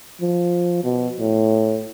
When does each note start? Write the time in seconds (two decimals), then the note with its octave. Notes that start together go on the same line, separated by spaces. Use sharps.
0.21 F3
0.84 B2
1.20 A2